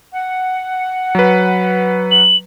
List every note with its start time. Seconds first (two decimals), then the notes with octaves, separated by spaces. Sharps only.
0.12 F#5
1.15 F#3 B4
2.11 F#7